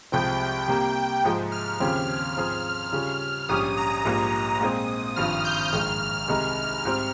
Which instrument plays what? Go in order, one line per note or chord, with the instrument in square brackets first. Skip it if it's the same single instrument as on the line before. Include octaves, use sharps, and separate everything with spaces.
[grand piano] C2 C3 F3 G#3 C4 [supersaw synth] G5
[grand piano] C3 G3 A#3
G#2 F3 G#3
[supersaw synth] F6
[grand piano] D#2 C#3 F3 C4 G4 [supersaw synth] F6
[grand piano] G#2 F3 C4 F4 G#4
C#3 G3 C#4 F4
[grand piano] A#1 G#2 G3 C#4 G4 [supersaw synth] D#6
[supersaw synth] A#5
[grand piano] A#1 G#2 G3 A#3 F4 [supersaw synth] D#6
[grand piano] A#2 G#3 C4
[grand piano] G#1 G2 F3 C4 [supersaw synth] F6
[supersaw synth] G6
[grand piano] A#1 G#2 D#3 G#3 [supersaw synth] F6
[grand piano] C2 C3 D#3 G#3 D#4
G#2 G3 C4